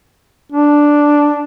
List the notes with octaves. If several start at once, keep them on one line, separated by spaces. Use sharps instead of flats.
D4